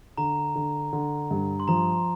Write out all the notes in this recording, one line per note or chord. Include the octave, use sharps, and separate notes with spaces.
D3 A#5
D3
D3
G2
C6
F3 A#5